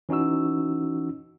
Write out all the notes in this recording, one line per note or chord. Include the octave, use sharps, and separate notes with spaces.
E3 C#4 D#4 F#4 E6